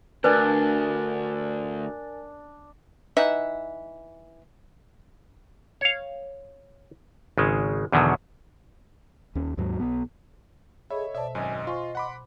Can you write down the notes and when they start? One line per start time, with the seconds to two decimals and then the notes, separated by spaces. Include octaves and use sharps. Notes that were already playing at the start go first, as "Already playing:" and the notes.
0.24 D2 D4 A#4 B4 G#5 A6
3.17 E3 D#4 E5 F#5
5.81 C#5 F5
7.38 G#1 C#3 G#3
7.92 E2 B2 D3 D#3 F#3
9.35 D#2 C#4
9.57 D#2 G#2 F#3
9.80 B1 B3
10.90 G#4 A4 C#5 D#5 E5 B5
11.15 B2 C5 D5 E5 A5
11.35 G#1 F#2 D#5 G#5
11.67 F4 C5 G#5 C6 C#6
11.95 F#5 B5 D6